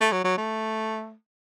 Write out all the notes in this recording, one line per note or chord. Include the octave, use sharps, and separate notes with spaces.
A3
F#3
F#3
A3